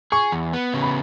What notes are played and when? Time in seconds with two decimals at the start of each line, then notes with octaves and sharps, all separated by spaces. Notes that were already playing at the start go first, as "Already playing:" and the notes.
0.12 G#4 C#6
0.32 E2
0.53 B3
0.74 C#3
0.82 B5